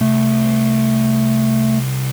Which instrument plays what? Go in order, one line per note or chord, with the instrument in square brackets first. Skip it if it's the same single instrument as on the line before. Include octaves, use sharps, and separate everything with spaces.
[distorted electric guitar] C2 [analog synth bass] A3